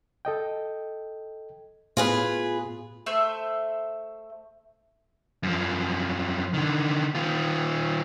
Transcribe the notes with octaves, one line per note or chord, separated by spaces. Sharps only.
A4 D#5 G5
A2 B3 F4 G#4 B4
A3 C5 E5 E6
F#2 F3
D3 D#3
D#3 F4